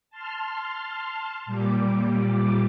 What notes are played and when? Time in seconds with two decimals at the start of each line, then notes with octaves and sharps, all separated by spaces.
0.10 A5 C6 F6
1.46 A#2 G3 D6